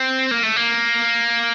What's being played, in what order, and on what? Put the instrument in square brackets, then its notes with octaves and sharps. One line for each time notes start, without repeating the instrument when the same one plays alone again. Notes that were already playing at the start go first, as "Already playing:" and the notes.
Already playing: [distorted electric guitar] C4
A#3
A3
A#3